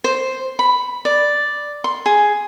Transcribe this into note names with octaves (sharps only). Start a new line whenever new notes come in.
C5
B5
D5
C6
G#4